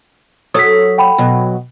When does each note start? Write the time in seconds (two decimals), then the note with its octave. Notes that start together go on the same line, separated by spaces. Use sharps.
0.54 F#3 A4 C#5 D#6 B6
0.98 F#5 G5 B5
1.18 B2 F#3